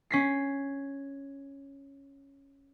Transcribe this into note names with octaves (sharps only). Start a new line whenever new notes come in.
C#4 B6 C7